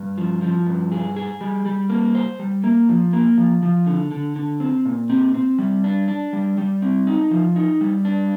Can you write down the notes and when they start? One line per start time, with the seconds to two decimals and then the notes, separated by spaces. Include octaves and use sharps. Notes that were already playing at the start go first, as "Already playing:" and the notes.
Already playing: G2
0.18 F3
0.42 F3
0.67 G2
0.92 G#4
1.16 G#4
1.41 G3
1.66 G3
1.90 A#3
2.15 C5
2.39 G3
2.64 A#3
2.89 F3
3.13 A#3
3.37 F3
3.63 F3
3.86 D3
4.11 D3
4.36 D3
4.60 C4
4.85 A#2
5.10 C4
5.34 C4
5.59 G3
5.84 D4
6.08 D4
6.33 G3
6.58 G3
6.82 C4
7.07 D#4
7.31 F3
7.56 D#4
7.81 G3
8.05 D4